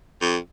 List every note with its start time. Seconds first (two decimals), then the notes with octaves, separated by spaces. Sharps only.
0.22 F2